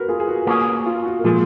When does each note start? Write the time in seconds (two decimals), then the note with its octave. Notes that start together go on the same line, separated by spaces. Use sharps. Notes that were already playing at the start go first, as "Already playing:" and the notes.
Already playing: F#4 A#4 B4
0.08 F4 G#4
0.20 G#4
0.28 F#4
0.47 A#3 C#4 G#4
0.86 F4
1.05 F#4
1.19 A#4
1.24 A#2 F3 G#3 F4 G#4